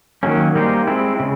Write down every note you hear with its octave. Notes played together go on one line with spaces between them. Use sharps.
D#3 F#3 A#3 C#4
G3 A#3 D#4 G4 C5
G#3 C4 E4
C#3